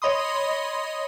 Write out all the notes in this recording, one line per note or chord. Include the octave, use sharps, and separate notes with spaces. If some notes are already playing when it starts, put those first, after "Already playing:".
C#5 D#5 B5 C6 D#6